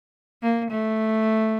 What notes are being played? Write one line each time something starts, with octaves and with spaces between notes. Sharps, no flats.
A#3
A3